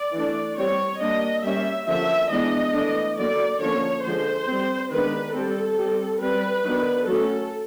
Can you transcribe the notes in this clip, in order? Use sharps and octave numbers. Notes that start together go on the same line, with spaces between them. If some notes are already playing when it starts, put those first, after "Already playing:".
Already playing: D5
E3 A3 D4
G3 C4 C#5
G3 A#3 D4 D#5
G3 A#3 C#4 E5
D3 F3 A#3 C#4 E5
E3 G#3 B3 D4 D#5
E3 A3 D4
D3 F#3 A#3 D5
D3 F3 A#3 C#4 C#5
D3 F3 G#3 C5
G3 C4
D#3 G#3 B3 D4 B4
G3 C4 A4
G3 C4
G3 C4 B4
D#3 F#3 B3 D4
F#3 A3 C#4 A4